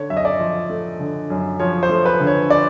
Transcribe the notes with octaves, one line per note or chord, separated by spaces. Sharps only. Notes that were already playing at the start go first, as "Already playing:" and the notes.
Already playing: D3 C#5
F#2 E5
D#5
D5
F3
A3
D3
F#2
F3 C#5
C5
A3
B4
D3
C#5
D5